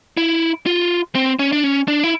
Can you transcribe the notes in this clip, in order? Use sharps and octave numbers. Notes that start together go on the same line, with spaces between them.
E4
F4
C4
C#4
D4
C#4
D4
E4